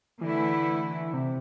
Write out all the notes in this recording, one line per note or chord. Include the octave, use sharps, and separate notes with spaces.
D3 E3 A3 E4
C3